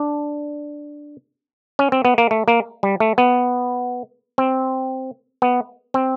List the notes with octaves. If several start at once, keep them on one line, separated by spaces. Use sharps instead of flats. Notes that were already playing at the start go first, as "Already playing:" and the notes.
Already playing: D4
C#4
C4
B3
A#3
A3
A#3
G3
A3
B3
C4
B3
C4